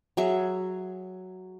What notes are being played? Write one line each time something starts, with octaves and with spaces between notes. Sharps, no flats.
F#3 G#4 E5